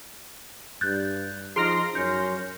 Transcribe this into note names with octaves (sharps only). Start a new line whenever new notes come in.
G2 F#6 G6 A6
F3 D#4 G#4 A#5 C6 F6 A#6 D7
F#2 C#4 G6 C#7